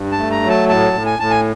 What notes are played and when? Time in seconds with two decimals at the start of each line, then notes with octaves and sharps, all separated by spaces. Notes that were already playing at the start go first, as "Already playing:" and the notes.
Already playing: G2
0.12 A5
0.18 A3
0.31 A#5
0.43 F#3
0.49 A5
0.69 A2 A5
0.93 A2
1.06 G#5
1.19 A2 A5
1.31 G#5